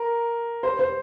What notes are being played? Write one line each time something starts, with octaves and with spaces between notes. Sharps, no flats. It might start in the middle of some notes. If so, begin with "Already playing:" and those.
Already playing: A#4
C5
C5